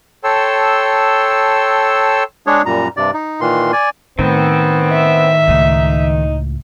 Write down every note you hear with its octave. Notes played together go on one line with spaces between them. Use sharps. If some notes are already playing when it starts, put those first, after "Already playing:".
A4 C#5 G5 A5 C6 E6
G#3 D4 G#4 C#5
F#2 A#2 G3 A#5
G2 C3 D5
D#4
A#2 D#3 E3 C6
D5 G#5
A2 D#3 B3 C4
E5
C#2 A2 D#4